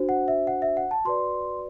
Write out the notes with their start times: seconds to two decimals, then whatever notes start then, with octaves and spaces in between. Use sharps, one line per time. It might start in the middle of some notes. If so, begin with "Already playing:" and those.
Already playing: D4 F#4 C5
0.09 F#5
0.28 E5
0.47 F#5
0.62 E5
0.77 F#5
0.91 A5
1.05 F#4 B4 D5 C6